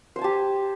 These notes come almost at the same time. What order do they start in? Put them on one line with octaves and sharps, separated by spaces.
C5 G#5 A5 G4